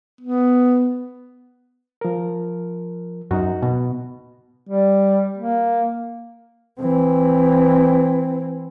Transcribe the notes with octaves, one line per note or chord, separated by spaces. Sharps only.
B3
F3 A#4
F#2 D#4 F#4
B2
G3
A#3
E3 C4